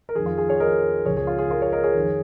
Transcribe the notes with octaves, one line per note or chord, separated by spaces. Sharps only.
A#4
F2 D#3 G#4
F4
G#4
G#4 C#5
A#4 D#5
C#2 C#3 F3 G#4 C#5
G#4
F4
G#4
F4 A#4
G#4 C#5
A#4 D#5
G#4 C#5
F2 D#3